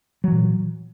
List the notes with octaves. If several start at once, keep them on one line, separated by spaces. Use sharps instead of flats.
A#2 E3 F#3